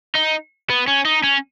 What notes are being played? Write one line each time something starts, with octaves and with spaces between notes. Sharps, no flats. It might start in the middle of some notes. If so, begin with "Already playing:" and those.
D#4
B3
C#4
D#4
C#4